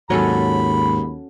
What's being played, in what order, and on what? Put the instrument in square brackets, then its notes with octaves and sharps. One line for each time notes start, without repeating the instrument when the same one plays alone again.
[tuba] D#2 [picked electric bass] G#2 [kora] F#3 C#4 A4 [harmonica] B5